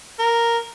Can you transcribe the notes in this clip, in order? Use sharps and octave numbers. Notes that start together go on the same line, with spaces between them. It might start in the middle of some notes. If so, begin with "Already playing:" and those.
A#4